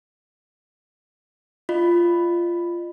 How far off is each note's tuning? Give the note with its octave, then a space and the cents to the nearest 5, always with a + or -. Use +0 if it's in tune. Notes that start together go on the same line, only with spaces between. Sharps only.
F4 -15 D#5 -35 B5 +0